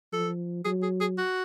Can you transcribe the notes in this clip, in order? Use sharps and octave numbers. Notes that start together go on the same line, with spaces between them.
F3 A4
F#3 G#4
G#4
G#4
F#4